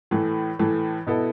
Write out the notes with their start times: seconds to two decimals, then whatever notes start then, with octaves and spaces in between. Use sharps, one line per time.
0.11 A2 E3 A3
0.59 A2 E3 A3
1.07 B2 B3 E4 A4